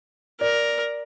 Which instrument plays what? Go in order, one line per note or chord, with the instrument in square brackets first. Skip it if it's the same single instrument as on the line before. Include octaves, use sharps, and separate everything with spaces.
[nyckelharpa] A#4 [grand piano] D5